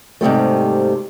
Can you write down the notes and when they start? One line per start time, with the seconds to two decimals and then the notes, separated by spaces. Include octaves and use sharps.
0.21 G#2 C3 F#3 G3 A3